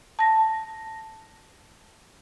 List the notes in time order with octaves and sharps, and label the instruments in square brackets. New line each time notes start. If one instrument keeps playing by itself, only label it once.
[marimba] A5 A#6